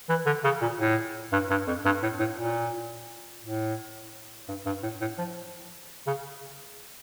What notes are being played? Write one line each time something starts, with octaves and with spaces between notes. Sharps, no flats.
E3
D3
C#3
A#2
A2
G2
G2
F2
G2
A2
A2
A#2
A2
G2
G2
A2
A2
F3
C#3